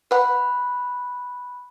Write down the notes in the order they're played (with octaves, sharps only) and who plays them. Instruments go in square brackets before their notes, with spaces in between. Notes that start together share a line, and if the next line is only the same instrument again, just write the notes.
[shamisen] B4 F#5 [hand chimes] B5 F#6